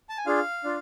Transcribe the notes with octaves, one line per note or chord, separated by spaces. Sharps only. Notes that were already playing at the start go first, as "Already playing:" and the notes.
A5
G#5
D4 F4 G#4 F5
D4 F4